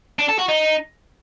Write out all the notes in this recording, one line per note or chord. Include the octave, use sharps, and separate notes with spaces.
D4
A4
F#4
D#4